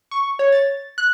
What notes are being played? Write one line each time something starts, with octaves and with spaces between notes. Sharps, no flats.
C#6
C#5
A6
F#6